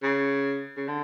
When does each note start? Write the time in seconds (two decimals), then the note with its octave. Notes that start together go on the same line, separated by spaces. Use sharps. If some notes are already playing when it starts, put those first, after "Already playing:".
0.03 C#3
0.77 C#3
0.88 D3